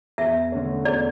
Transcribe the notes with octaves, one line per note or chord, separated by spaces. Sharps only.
E2 E5
D3 A3 C#4
E2 D5